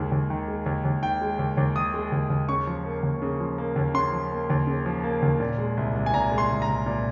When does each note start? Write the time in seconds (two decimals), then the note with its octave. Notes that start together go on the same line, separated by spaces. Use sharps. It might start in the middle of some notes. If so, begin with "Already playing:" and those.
Already playing: D#2 D#3 G#3
0.12 D#2
0.30 D#3
0.48 G#3
0.66 D#2
0.85 D#2
1.02 D#3 G5
1.22 G#3
1.39 D#2
1.57 D#2
1.76 D#3 D#6
1.94 G#3
2.12 D#2
2.30 D#2
2.48 C#3 C#6
2.67 F3
2.85 A#3
3.03 D#2
3.22 C#3
3.40 F3
3.58 A#3
3.76 D#2
3.94 C#3 C6
4.12 F3
4.32 A#3
4.50 D#2
4.67 C#3
4.86 F3
5.04 A#3
5.22 D#2
5.40 A#2
5.58 G#3
5.77 C2
5.95 C2
6.06 G#5
6.13 A#2 A#5
6.32 G#3
6.38 C6
6.50 C2
6.62 A#5
6.67 C2
6.86 A#2